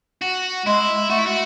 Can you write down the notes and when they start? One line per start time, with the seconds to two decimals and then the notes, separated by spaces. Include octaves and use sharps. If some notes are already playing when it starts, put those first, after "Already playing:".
0.22 F#4
0.66 G#3 E4
1.10 A3 F#4
1.18 E4
1.26 F#4